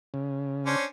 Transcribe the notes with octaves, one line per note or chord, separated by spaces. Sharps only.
C#3
C#4 D4 C5